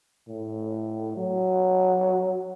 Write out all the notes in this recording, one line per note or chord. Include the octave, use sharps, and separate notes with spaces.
A2
F#3